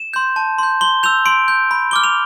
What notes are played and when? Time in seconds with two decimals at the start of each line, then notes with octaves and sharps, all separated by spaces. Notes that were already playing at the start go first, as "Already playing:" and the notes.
Already playing: E7
0.13 C6 G6
0.36 A5
0.58 C6 G6
0.81 C6 G7
1.03 E6 G6 F7
1.26 C6 D7
1.48 G6
1.71 B5
1.91 D6 F6 G7
2.04 F7